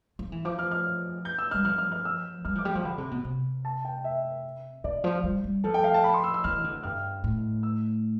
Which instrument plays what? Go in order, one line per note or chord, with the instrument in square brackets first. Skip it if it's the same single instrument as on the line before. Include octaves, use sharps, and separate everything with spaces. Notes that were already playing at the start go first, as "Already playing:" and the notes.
[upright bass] F3
E3
[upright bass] F3 [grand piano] D6
[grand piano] F6
F6
G6
E6
[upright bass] G3 [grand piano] F6
[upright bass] F3 [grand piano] F6
[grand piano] F6
F6
E6
[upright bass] G3 [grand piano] F6
[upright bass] F3 [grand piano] D6
[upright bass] G3
F3
[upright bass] D3 [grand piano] B5
[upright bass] C3
B2
C3
[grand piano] A5
G5
E5
[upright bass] D3 [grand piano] D5
[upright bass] F3
G3
G3
[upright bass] F3 [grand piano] A4
[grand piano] G5
F5
A5
B5
C6
E6
E6
[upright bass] E3 [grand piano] F6
[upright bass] D3
[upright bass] G2 [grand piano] F6
[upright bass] A2
[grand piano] E6